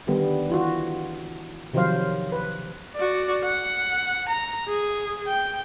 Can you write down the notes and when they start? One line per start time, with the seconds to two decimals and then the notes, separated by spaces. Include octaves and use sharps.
0.07 D3 D#3 G3 B3
0.49 E3 F4 F#4
1.74 C3 D#3 F3 F#3 C5 F5
2.32 B4
2.96 F#4 D5
3.44 F#5
4.29 A#5
4.69 G#4
5.27 G5